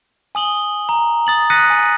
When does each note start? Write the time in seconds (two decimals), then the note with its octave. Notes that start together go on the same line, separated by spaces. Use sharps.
0.35 G#5 D#6 F#7 G7
0.89 A#5
1.27 D#6 A6 F#7
1.50 D#6 F#6 A#6 B6 C#7 D#7
1.70 G#5